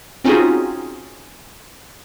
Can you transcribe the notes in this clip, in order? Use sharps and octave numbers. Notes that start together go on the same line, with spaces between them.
C4 C#4 D#4 F4 F#4 G#4